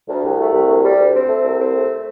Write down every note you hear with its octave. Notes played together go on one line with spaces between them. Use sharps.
D2
C2
A3
C2
D2
G3
D2
C4
A3
C2
C4
A3